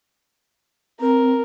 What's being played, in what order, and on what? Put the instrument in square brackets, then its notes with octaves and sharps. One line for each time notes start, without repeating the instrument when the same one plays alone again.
[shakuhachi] C4 [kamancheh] A#4